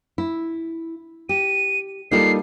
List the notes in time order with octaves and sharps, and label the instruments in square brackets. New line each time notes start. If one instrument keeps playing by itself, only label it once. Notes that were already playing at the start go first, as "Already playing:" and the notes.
[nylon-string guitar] E4
[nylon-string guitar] G4 [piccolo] D#7
[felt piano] G3 A#3 [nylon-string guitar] D#4 F4 A4 [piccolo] C7